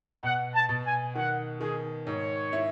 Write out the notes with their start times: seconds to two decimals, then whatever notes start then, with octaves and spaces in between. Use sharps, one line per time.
0.23 B2 F#5
0.54 A5
0.69 B2
0.84 G#5
1.15 D#3 F#5
1.60 D#3 G#4
2.06 G#2 C#5
2.53 E4